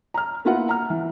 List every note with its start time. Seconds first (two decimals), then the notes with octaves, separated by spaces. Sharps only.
0.14 A#5 F6
0.45 A#3 B3 E4 F4 A#4 F#5
0.69 A#5 F6
0.90 E3